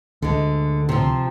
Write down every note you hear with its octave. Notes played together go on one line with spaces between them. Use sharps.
D2 D3 G#3
C3 F3